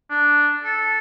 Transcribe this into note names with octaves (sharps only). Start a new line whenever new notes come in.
D4
A4